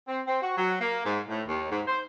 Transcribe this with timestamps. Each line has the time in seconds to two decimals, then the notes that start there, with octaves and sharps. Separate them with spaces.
0.08 C4
0.27 C4
0.42 F#4
0.57 F#3
0.81 A#3
1.05 G#2
1.29 A2
1.47 D#2
1.70 G#2
1.88 C5